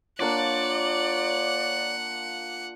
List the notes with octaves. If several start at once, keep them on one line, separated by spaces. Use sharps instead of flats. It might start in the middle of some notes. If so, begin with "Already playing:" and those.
A#3 D4 F4 C#5 D5 F#5